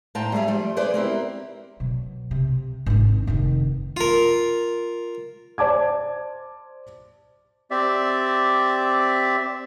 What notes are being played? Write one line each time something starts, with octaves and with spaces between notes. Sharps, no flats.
A2 A#3 C5 G5 A5 A#5
G3 G#3 G#4 E5 G#5
F3 G3 A3
G#4 B4 C5 D5
A#3 C4 E4 G4
B2 F#3
C3
G#1 D4
F1 D#3
F4 A#4
C5 D5 A5 D6 G#6
C4 G4 D5 E5